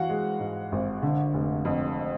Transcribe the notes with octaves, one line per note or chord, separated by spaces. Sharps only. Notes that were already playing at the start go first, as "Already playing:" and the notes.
Already playing: E3 F#4 F5 F#5
G#3
G#2
G#1
D3
F1
F2